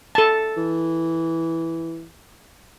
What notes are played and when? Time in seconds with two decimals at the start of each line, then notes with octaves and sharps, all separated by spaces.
0.15 A4 A5
0.57 E3